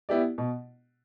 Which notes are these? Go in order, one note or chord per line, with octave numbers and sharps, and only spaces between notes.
B3 E4 G4 D5
B2